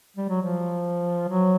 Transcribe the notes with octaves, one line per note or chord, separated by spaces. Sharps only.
G3
F#3
F3
F#3